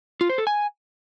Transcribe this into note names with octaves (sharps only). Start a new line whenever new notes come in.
F4
C5
A4
G#5